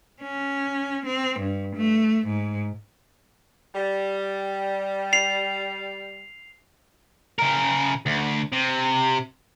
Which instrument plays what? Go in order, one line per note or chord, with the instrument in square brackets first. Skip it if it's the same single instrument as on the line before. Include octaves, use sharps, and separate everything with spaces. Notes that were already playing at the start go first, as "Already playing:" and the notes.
[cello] C#4
C4
G2
A3
G#2
[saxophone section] G3
[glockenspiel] C7 F7
[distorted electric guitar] C#3 A#4
D2
C3